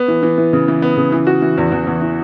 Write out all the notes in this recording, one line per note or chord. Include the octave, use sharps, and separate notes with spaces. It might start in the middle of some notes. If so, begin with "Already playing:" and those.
Already playing: B3
E3
E3
E3
C#3
E3
B3
C#3
E3
F#4
E3
E2
E2
E2
E3